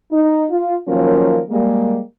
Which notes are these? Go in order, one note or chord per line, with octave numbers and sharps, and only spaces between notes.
D#4
F4
D#3 F3 F#3 A#3 C#4 A#4
G3 G#3 A#3